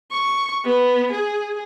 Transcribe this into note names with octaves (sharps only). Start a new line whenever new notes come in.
C#6
B3
G#4